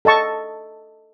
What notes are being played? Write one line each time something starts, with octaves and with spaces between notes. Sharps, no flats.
A4 D#5 A5 C#6